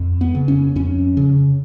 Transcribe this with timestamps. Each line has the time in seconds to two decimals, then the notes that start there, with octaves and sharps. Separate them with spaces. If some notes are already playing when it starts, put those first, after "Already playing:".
Already playing: F2
0.21 B3
0.35 C#3
0.48 C#4
0.76 F2 C#4
1.17 C#3